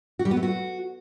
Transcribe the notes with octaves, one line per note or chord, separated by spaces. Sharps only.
F#4
G3
B3
A3
F#4